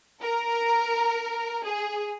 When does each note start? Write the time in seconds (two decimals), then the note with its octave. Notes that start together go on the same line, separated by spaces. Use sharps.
0.20 A#4
1.65 G#4